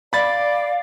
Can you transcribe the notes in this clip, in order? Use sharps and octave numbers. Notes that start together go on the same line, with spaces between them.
D5 F5 B5 A6